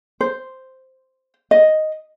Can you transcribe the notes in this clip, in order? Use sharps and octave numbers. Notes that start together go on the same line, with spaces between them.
C5
D#5